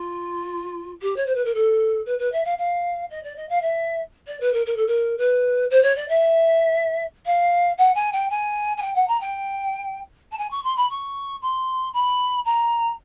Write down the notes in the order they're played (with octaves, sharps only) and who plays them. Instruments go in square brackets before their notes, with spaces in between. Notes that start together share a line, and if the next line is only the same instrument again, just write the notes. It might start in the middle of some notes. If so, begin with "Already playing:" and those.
Already playing: [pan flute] F4
G4
C#5
C5
B4
A#4
A4
B4
B4
E5
F5
F5
D#5
D5
D#5
F5
E5
D5
B4
A#4
A#4
A4
A#4
B4
C5
C#5
D5
E5
F5
F#5
G#5
G5
G#5
G#5
G5
F#5
A#5
G5
A5
G#5
C#6
C6
B5
C#6
C6
B5
A#5